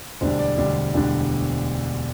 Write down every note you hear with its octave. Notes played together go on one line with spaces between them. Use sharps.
E1 D2 D3 G3 D4 C5
D5
E1 D2 D3 G3 D4
E1 D2 D3 G3 D4